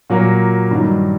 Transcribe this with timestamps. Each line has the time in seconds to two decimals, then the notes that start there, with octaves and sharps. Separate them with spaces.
0.10 A#2 F#3 A#3
0.71 G2 D#3 F#3